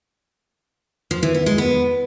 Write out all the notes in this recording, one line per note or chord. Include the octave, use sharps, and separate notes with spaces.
F3
E3
B3
G#3
B3